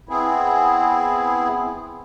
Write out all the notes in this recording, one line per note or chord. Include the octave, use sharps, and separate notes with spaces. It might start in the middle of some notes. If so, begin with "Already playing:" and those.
B3 C4 E4 G#4